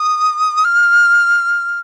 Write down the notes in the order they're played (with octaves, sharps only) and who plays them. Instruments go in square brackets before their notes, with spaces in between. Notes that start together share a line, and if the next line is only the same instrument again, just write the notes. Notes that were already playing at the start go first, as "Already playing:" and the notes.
Already playing: [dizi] D#6
F6